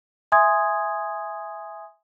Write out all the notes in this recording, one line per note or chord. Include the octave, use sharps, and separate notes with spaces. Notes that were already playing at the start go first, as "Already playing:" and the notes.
E5 G#5 C6 D#6 G#6